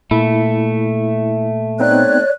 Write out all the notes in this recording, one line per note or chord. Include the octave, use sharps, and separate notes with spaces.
A#2 A3 E4
B3 C4 D#4 C#5 D5 F#6